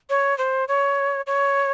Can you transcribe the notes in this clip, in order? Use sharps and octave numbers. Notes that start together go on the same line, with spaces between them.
C#5
C5
C#5
C#5